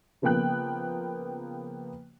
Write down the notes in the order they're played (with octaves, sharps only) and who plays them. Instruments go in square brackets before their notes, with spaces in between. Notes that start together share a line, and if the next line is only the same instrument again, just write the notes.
[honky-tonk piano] C#3 F3 A#3 B3 G5 F#6